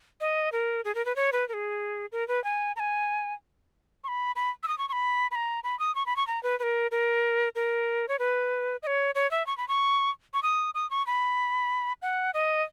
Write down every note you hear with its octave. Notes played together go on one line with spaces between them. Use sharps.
D#5
A#4
G#4
A#4
B4
C#5
B4
A#4
G#4
A#4
B4
G#5
A#5
G#5
C#6
B5
B5
E6
D#6
C#6
C#6
B5
B5
A#5
B5
D#6
C#6
B5
C#6
A#5
B4
B4
A#4
A#4
A#4
C#5
B4
D#5
C#5
C#5
E5
C#6
B5
C#6
C#6
D#6
D#6
C#6
B5
F#5
D#5